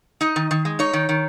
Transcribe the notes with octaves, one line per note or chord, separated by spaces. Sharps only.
D#4 D#5
D#3
D#3
G#3
D#4 C#5
D#3
D#3